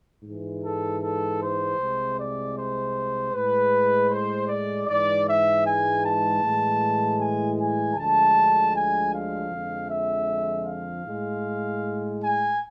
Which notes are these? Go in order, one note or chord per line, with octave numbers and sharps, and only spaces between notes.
G#2 E3 G#3
A4
A4
C5
C2 C3 G#3
D5
C5
A2 G#3 B4
C5
D5
G#2 E3 G#3 D5
E5
G#5
A5
A2 E3 G#3
G#5
G#5
D2 D3 F3 G#3 A5
G#5
F5
F2 D3 F3 G#3
E5
F5
A2 G#3
G#5